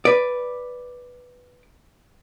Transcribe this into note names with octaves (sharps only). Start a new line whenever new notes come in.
B4 D5